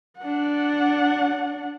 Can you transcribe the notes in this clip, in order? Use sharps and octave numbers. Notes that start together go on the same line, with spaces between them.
D4 F#5